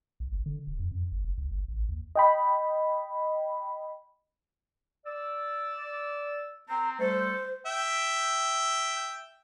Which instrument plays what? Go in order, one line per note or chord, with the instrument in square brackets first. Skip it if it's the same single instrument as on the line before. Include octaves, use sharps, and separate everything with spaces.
[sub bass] B1
G1
D3
D1
F2
F2
G1
F1
C#2
G1
A1
D#2
[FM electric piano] D#5 G5 B5
[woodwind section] D5 E6
[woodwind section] C4 [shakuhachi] A#5
[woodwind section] G3 A3 A4 [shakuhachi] C5
[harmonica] E5 G5